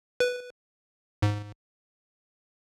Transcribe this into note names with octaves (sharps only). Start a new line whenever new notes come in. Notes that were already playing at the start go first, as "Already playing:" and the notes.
B4
G#2